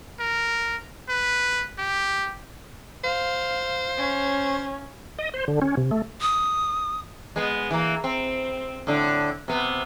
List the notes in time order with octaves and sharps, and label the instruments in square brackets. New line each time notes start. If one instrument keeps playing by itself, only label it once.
[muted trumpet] A#4
B4
G4
[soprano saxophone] C5 [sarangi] F5
[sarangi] C#4
[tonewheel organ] D#5
C5
D3
C#4
C3
A3
[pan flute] D#6
[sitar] G#3 B3
E3 A#3
C4
A2 D3
C3 B3